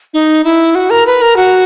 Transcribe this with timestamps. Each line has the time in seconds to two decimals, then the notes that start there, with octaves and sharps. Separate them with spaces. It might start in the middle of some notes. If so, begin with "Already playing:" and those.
0.14 D#4
0.44 E4
0.75 F#4
0.90 A#4
1.06 B4
1.22 A#4
1.37 F#4